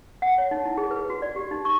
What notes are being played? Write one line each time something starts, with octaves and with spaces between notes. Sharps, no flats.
F#5
C#5
D#4
E4
G#4
B4
F#4
D5
G4
D#4
C#6